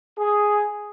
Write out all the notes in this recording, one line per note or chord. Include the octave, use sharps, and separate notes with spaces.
G#4